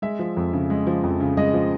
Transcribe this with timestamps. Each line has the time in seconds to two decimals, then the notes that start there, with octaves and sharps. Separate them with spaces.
0.02 G#3 E5
0.19 F3
0.37 F2
0.53 C#3
0.70 G#3
0.87 F3
1.03 F2
1.20 C#3
1.37 G#3 D#5
1.54 F3